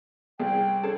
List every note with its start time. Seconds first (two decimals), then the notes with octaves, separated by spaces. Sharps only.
0.40 C2 G#4 G5
0.83 C#4 G#4 A4 A5